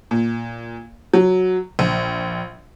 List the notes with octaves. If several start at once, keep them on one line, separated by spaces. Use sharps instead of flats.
A#2
F#3
A#1